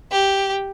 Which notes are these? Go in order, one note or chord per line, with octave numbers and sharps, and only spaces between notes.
G4